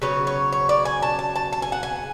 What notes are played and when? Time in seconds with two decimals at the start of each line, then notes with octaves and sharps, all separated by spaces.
0.02 C#3 F#3 B3 C#5
0.27 C#5
0.53 C#5
0.69 D5
0.85 G#5
1.02 A5
1.19 A5
1.36 A5
1.53 A5
1.62 G#5
1.72 F#5
1.83 G#5